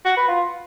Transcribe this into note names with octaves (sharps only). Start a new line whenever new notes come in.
F#4
B4
F4